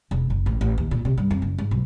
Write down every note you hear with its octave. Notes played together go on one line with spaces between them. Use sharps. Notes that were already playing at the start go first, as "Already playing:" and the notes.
E1
F#1
A1
A1
D#2
A#2
C3
G2
F2
F#1
G#2
B1